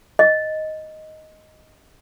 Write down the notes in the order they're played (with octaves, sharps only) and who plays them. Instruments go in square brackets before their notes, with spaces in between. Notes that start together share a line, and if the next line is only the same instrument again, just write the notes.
[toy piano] D#5